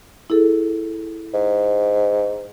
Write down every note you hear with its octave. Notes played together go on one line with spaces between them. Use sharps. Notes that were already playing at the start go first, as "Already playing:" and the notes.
E4 G#4 A4
G#2